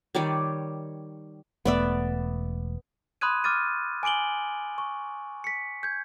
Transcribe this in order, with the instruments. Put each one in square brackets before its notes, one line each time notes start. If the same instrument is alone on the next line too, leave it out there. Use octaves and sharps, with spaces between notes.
[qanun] D#3 G3 C#5 D5
[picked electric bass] E1 A3 [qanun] B3 D5 E5
[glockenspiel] B5 C6 D#6 F#6 G#6 D#7
D6 F6 A6 D#7
G#5 D6 D7 F#7 G7
C#6
B6 C#7
G6 G#6